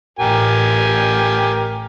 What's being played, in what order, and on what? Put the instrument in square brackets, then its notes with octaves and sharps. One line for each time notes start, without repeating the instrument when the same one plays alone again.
[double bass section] A1 [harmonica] G4 A#4 G#5